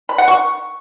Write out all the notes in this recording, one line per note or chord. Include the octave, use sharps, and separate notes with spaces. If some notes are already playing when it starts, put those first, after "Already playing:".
B5
F#5
C#6